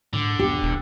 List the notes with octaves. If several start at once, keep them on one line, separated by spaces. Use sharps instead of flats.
G#2 D3
D#1 B3 G4
E1